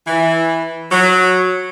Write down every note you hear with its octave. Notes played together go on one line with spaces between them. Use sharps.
E3
F#3